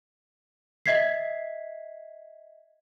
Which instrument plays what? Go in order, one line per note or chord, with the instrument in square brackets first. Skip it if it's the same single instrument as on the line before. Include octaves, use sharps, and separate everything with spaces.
[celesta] D#5 E5 G#6 B6 C7